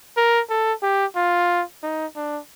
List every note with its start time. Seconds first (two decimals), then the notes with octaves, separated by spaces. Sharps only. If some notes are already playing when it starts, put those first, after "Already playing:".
0.17 A#4
0.50 A4
0.83 G4
1.16 F4
1.83 D#4
2.16 D4